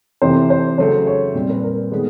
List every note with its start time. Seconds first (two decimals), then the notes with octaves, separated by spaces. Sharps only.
0.22 C3 E3 A3 C4 C5
0.50 C5
0.78 C#3 F#3 A3 C5
1.07 C#5
1.35 A#2 G3 C4
1.50 B4
1.63 A#4
1.92 D#3 G#3 B3 A4